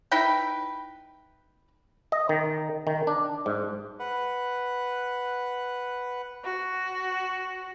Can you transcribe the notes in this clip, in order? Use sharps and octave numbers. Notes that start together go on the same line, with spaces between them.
D#4 E4 B4 G5
D#5
D#3
D#3
D4
G#2
B4 F#5
F#4